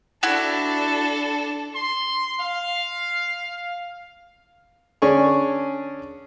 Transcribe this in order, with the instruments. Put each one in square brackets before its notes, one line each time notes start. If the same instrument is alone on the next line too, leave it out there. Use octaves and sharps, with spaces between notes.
[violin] D4 A4 [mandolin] E4 F#4
[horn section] C6
F5
[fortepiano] D3 C#4 G#4 D5 C#6